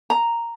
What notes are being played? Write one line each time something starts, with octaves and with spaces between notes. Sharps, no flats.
A#5